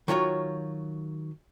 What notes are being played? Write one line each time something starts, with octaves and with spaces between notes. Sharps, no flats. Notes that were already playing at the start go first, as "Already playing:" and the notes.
D#3 F#3 F4 C#5